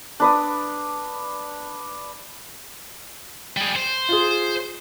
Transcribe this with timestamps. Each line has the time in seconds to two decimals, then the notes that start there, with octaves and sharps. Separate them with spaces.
0.20 D4 B4 D#6
3.57 G3 G#4
3.76 C5
4.09 F4 G#4